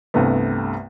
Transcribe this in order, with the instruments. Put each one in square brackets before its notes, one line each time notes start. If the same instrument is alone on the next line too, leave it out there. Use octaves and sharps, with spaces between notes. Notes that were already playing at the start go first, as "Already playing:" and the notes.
[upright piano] C2 G2 C3 A3 B3